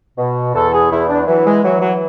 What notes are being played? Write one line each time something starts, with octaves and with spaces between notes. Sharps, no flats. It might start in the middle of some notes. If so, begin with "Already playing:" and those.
B2
E2 A4
G#4
E2 E4
D4
E3 F#3
G#3
E3 F#3
F#3